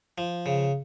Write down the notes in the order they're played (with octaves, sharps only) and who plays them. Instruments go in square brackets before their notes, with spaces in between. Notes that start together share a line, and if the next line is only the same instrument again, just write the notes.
[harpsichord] F3
C#3